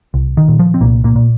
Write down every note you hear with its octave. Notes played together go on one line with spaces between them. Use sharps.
C2
D#3
A#2
F3
C4
C2 A#2 A#3
A#2 A#3
A#2